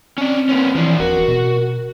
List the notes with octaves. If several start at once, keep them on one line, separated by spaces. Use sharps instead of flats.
C4 C#4 D5
A#3 B3 C#4
E3 F3 D4
D#1 F#4 A#4
B2